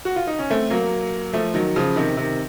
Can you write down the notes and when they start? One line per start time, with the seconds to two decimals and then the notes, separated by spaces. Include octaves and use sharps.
0.05 F#4
0.16 F4
0.27 D#4
0.39 C#4
0.50 A3 C4
0.70 F#3 A#3
1.33 F3 A3
1.54 D#3 F#3
1.76 C#3 F3
1.96 C3 D#3
2.17 C3 D#3